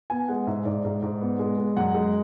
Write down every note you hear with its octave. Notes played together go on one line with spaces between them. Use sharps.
B3 G#5
G#3 F#5
G#2 E5
G#2 D5
G#2
G#2
B3
G#3
G#3
F#2 F#5
G#3